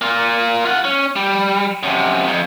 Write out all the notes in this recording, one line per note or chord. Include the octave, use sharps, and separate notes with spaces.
A#3 F4
F4 F#5
C#4
G3
F#2 C3
F2